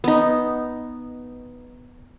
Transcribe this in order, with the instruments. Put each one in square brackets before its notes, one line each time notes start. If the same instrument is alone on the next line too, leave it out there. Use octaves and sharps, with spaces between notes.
[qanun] B3 D#4